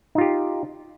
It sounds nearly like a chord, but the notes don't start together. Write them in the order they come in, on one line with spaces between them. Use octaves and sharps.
D#4 F4 G4